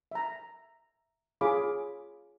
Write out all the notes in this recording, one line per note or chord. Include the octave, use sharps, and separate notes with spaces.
E5 A#5
F4 G#4 C#5 F5 B5 D6